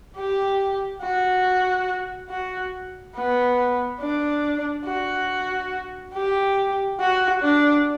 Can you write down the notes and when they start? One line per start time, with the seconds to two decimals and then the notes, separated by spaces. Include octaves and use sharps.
0.17 G4
1.02 F#4
2.30 F#4
3.16 B3
4.00 D4
4.86 F#4
6.14 G4
7.00 F#4
7.42 D4